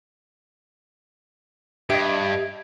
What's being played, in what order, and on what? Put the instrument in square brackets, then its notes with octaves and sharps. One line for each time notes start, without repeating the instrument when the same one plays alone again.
[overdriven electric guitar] G2 [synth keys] G4 D7 [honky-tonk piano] D#5 E5 [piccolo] G#6